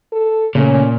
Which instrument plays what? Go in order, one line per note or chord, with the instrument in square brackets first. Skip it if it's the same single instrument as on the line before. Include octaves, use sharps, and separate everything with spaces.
[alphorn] A4
[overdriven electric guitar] A#2 [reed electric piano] C#3 A3 [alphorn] C#4